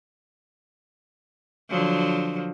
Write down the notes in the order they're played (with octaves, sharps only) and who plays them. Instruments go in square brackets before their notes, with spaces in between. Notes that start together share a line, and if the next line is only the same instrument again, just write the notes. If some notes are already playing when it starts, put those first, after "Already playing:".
[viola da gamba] D3 F3 F#3